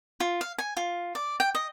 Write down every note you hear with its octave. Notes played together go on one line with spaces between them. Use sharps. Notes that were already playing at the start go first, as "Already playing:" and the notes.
F4
F5
G#5
F4
D5
G5
D#5